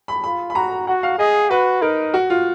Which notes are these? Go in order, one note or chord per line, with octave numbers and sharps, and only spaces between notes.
B5
F4 B5
B5
F#4 A#5
F#4 F#5
F5
G#4 D#5
F#4 B4
D#4 A#4
F#4
F4